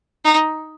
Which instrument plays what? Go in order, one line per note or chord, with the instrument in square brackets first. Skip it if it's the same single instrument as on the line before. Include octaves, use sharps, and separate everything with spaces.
[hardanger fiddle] D#4